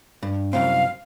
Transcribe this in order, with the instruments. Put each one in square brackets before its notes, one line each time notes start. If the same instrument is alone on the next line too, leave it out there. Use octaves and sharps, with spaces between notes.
[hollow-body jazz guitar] G2
[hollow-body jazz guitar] C2 F#2 C4 [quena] F5